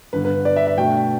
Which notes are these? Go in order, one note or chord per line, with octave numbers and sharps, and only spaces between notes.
G2 D3 B3 B4
B4
D5
E5
E5
B2 A3 D4 G5